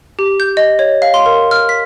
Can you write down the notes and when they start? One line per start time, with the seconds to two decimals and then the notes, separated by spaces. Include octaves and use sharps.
0.19 G4
0.40 G6
0.57 D#5
0.79 C#5
1.02 F5
1.14 C6
1.26 A#4
1.51 F6
1.69 B6